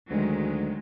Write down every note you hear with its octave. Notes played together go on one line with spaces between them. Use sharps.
D2 D#3 F#3 G#3